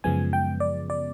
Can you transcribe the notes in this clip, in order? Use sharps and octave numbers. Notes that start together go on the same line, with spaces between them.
F#2 C#3 F3 G#3 B3 G#5
G5
D5
D5